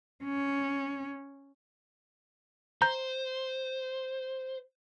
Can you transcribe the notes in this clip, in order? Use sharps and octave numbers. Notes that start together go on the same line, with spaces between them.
C#4
C5 A#5 G6